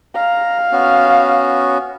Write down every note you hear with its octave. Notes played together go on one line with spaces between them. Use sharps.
F5 A#5
B3 C#4 F#4